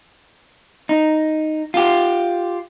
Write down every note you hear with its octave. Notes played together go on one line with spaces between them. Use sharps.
D#4
F4 G4